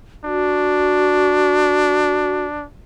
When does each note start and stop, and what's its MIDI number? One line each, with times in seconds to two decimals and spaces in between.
0.25 2.65 62
0.25 2.44 66